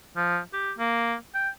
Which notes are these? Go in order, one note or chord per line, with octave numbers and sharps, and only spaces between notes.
F3
G4
A#3
G5